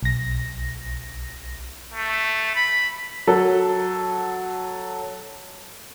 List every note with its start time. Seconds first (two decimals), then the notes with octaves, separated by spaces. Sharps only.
0.03 B1 A#6
1.94 A3
2.56 B5
3.27 F#3 A4